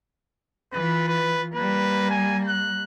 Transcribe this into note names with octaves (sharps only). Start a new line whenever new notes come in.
E3 F4 B4
B4
G3 A#3 B4
G#5
F#6